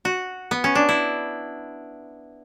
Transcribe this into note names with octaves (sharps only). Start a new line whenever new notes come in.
F#4
B3
C#4
D4
E4